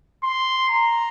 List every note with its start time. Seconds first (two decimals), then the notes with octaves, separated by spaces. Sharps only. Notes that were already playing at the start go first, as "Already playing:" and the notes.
0.24 C6
0.69 A#5